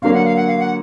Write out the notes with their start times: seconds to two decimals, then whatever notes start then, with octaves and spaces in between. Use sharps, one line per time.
0.02 D3 F#3 A#3 F5
0.13 F#5
0.25 F5
0.36 F#5
0.47 F5
0.59 F#5